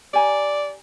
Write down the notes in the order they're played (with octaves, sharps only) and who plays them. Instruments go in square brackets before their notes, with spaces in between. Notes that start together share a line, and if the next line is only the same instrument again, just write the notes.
[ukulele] G4 G#5 A#5 [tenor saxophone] D5